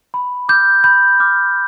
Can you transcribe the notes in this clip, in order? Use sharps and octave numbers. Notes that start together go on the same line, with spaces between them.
B5
D6 F6 G6
B5 G6
D6 F6